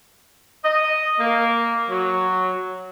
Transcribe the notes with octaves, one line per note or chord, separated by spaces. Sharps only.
D#5
A#3
F#3